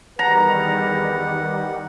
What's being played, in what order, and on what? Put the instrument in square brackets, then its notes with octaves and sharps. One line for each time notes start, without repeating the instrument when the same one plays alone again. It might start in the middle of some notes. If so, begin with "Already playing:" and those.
[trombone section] E2 G#4 B4 [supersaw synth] D#3 G3 [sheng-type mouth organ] F#5 [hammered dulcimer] A#5